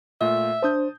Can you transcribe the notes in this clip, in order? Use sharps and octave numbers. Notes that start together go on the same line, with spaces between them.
A#2 A3 F4 E5
D4 C5 A5 D#6 G6